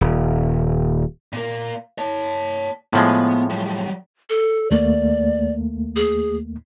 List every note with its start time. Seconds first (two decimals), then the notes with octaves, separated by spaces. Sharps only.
0.01 D#1
1.33 A#2 A#3
1.98 C#5 A5
2.93 A2 F3 G#3 B3
3.50 F#3 G3
4.29 A4
4.71 D#2 A3 A#3 D5
5.96 G#4